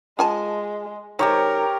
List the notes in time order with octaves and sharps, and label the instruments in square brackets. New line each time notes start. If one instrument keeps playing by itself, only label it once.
[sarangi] G#3 [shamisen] F4 G#5 A5
[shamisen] D#3 G#3 [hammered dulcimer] G4 C#5 [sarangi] A#4